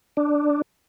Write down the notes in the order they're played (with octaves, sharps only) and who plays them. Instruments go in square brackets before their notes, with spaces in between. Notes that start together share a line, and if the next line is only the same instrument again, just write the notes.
[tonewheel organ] D4